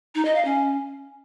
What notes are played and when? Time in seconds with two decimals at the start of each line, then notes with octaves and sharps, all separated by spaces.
0.15 D#4
0.25 D#5
0.35 F5
0.45 C#4